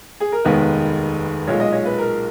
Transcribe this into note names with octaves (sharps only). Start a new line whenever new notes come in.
G#4
A#4
F1 D#2 D#3 G#3 B3 B4
B1 A#2 G#3 C#5
D#5
C#5
B4
A#4